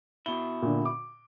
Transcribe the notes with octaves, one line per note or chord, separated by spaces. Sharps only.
B2 E4 G7
A#2 D3
D6